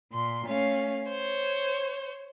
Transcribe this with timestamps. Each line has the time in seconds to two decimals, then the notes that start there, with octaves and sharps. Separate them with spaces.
0.11 A#2 C6
0.47 A3 C#4 F5
1.08 C5 C#5